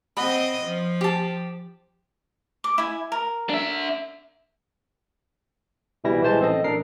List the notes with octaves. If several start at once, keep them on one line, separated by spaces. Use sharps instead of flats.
C4 D#5 F#5 B5
F3
G4 A5
D6
E4 G#5
A#4
D4 E5
C2 B2 E3 G3 E4 A#6
B1 E3 G#3 C5 A5
A1 C4 A4 D#5
A1 D4 A#4 C7